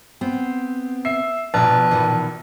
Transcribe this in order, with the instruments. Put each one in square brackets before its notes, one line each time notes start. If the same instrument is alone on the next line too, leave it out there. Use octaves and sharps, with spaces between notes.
[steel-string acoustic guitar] B3 C4
[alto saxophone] E5 [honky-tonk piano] C7
[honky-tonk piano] A#1 [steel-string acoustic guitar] B2 A#5 [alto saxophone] B4 [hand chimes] A5
[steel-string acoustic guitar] B2 D#3 E3